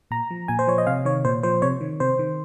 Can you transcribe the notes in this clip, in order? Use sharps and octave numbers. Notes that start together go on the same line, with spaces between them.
A#2 A#5
F3
A#2 G#5
C5
F3 C#5
D#5
C3 F5
D#3 C#5
A#2 C5
F3 C5
C3 C#5
D#3
C3 C5
D#3